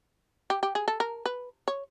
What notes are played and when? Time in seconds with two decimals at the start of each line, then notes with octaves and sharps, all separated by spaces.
0.50 G4
0.63 G4
0.75 G#4
0.88 A4
1.00 A#4
1.26 B4
1.68 C#5